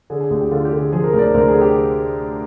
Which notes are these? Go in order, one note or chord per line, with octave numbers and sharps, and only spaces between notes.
D3 G#4
G#4
D2 G4
G4
D3 F4
G4
D3
G#4
F3 G#4
A#4
D2 A#4
D5
C5
D2 A#4
G#4
D3
G4